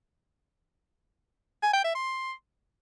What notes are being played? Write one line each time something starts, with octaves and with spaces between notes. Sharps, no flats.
G#5
G5
E5
C6